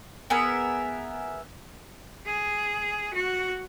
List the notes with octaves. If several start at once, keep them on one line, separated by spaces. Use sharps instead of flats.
B3 G#4 A#4 E5
G#4
F#4